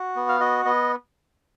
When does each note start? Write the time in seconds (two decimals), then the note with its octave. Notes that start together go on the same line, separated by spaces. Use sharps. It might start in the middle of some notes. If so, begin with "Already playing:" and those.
Already playing: F#4
0.16 B3
0.29 F5
0.40 F#4 D#5
0.65 B3 D#5